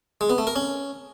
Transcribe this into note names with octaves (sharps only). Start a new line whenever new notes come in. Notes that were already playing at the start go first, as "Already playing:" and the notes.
G#3
B3
A3
A#4
C#4